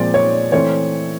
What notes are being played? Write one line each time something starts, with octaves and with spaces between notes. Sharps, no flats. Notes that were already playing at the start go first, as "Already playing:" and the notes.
Already playing: A#2 F3 G#3 C4 D5
C#5
E3 A3 C4 C#5